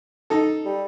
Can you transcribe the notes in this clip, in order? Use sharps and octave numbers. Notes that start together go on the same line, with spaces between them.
D#4 A4
G3